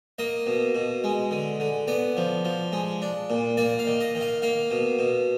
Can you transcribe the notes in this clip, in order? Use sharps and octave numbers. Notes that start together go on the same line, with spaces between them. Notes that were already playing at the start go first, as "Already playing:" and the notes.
A#3 D#5
B2
B2
G#3
D3
D3
B3 D5
F3
F3
G#3
D4
A#2
A#3 D5
F5
D#3
D#5
D#3
F5
A#3 F5
B2
B2